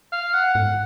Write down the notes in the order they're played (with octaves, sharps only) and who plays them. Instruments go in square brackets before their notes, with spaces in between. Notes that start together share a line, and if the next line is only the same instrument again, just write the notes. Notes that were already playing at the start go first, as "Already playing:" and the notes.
[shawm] F5
F#5
[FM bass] G#2 [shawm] F#5